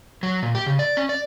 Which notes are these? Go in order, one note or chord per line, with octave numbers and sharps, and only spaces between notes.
F#3
A#2
G4
C#3
D5
C#4
D5